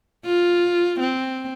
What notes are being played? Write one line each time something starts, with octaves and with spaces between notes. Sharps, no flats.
F4
C4